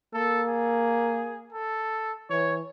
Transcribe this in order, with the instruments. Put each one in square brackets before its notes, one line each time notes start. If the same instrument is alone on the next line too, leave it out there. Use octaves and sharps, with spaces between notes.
[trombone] A#3 [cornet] A4
[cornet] G#4
A4
[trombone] E3 [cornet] C#5